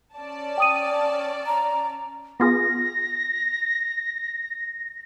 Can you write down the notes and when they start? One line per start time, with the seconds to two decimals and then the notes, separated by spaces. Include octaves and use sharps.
0.16 C#4 D5 A5
0.58 G5 D#6 D#7
1.46 A#5
2.40 B3 F4 G#4 A#6